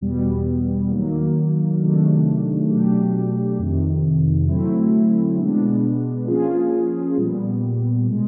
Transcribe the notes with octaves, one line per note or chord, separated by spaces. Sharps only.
E2 B2 G3 B3
D#3 F#3 A#3
C3 D#3 F#3 A3 D4
B2 F#3 A3 D4 G4
F2 C3 D#3
D3 F#3 A3 C4 E4
B2 G#3 B3 D4
F3 A#3 C#4 F4 G#4
A#2 G3 B3
B2 G#3